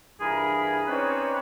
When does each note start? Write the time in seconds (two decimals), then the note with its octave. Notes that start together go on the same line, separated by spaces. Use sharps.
0.20 G2 E3 F4 G#4 A#4 B5
0.88 C4 C#4 D#4 B4 C#5 D5